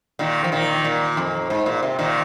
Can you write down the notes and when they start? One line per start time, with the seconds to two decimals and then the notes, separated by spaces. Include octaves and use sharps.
0.19 A#2 D#3
0.44 F3
0.52 A#2 D#3
0.84 A#2
1.17 F2
1.50 G#2
1.66 A#2
1.83 C3
1.99 A#2 D#3